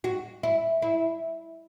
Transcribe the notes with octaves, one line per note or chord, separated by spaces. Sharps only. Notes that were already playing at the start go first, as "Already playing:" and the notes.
F#4
E4
E4